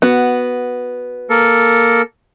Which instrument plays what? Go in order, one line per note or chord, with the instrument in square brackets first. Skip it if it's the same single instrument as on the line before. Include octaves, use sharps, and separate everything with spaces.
[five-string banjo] B3 F#4
[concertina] A#3 A4 A#4